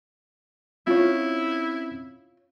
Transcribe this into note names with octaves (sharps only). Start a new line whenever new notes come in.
C4 C#4 E4 F4 C#5